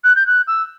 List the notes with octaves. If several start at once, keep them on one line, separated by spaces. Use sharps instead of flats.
F#6
G6
F#6
E6